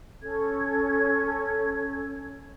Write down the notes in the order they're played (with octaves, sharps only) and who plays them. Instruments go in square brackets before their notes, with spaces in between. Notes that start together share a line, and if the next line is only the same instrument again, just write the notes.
[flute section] C#4 A4 G#6